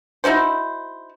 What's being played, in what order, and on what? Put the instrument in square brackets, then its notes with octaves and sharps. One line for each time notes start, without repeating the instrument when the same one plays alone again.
[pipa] D#4 E4 F#4 C5